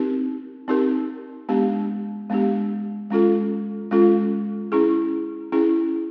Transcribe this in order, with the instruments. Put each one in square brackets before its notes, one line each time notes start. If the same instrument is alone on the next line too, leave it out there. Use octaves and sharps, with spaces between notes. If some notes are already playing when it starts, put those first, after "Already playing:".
Already playing: [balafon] C4 D#4 G4 A#4
C4 D#4 G4 A#4
G#3 B3 D4 G4
G#3 B3 D4 G4
G#3 C#4 F4 A4
G#3 C#4 F4 A4
C#4 E4 G#4
C#4 E4 G#4